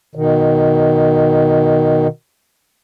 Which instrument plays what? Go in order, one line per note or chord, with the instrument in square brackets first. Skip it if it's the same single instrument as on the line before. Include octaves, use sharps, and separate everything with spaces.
[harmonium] B2 D#3